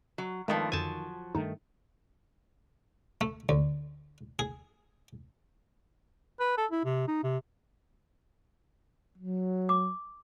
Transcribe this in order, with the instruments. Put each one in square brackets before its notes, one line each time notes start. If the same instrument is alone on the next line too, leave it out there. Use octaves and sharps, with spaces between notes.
[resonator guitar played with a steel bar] F#3
[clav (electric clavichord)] G2 B3 [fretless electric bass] D#3 [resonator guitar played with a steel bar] F3 A3 A#4 [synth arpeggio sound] G#3
[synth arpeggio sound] F2 D3 [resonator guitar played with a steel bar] F3 F#3 [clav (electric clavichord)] G#5 A5
[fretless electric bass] G2 D#3 A3 [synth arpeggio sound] D#4
[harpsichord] A3
D2
G#4
[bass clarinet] B4
A4
E4
C3
D#4
C3
[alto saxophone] F#3
[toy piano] D6